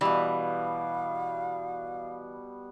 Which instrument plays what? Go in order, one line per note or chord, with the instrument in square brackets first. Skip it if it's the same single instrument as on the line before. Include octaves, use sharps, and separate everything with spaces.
[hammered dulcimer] B2 G3 [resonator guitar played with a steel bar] E3 [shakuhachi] F5